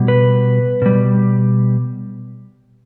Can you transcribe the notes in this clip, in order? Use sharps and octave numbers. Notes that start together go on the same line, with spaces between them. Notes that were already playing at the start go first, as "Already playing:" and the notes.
Already playing: B2 G3
B4
B2 G3